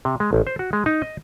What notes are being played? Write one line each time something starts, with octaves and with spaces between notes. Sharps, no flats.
C3
G#3
A1
C5
F#4
G#3
D#4
D#5